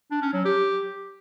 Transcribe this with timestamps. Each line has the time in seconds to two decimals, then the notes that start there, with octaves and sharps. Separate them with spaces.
0.11 D4
0.22 C#4
0.33 F#3
0.45 G4